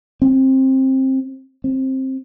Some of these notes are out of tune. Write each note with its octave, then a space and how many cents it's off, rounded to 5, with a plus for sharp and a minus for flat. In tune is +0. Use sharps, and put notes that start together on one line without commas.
C4 +20
C4 +15